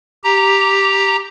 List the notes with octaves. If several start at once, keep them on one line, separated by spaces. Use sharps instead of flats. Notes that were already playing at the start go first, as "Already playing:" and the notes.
G4 A#5